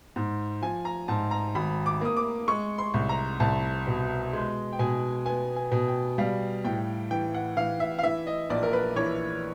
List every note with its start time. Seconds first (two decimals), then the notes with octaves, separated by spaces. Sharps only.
0.16 G#2
0.62 F3 G#5
0.85 A#5
1.08 G#2 A5
1.31 A#5
1.55 G#1 B5
1.86 D6
2.01 A#3 D#6
2.17 D6
2.48 G#3 C#6
2.78 C6
2.94 C2
3.09 A#5
3.40 C2 A5
3.87 B2
4.33 G#3
4.73 G5
4.79 B2 G#5
5.26 B3 G#5
5.56 G#5
5.72 B2
5.88 G5
6.18 G3 F5
6.65 A2 G5
7.11 E3 G5
7.34 F#5
7.57 E3 F5
7.80 E5
7.99 F5
8.03 E3 E5
8.27 D#5
8.50 A#1 D5
8.63 A#4
8.73 B4
8.96 E3 C#5